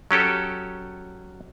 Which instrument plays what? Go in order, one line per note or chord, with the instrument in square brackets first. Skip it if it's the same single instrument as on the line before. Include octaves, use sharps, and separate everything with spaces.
[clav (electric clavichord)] F#3 C#4 G4 A4